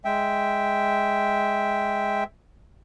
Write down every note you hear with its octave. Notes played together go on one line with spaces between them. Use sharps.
G#3 E5 G5